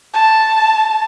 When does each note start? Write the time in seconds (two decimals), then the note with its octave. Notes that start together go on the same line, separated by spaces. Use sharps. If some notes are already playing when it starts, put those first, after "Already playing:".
0.14 A5